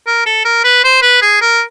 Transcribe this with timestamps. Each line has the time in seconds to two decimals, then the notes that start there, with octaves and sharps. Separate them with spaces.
0.07 A#4
0.26 A4
0.45 A#4
0.64 B4
0.84 C5
1.02 B4
1.22 G#4
1.42 A#4